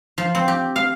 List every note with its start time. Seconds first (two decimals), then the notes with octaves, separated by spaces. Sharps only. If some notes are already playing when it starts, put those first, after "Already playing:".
0.18 F3
0.35 C4
0.48 G4
0.76 F5